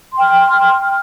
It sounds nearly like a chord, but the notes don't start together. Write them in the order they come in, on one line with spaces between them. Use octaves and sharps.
C6 G5 F6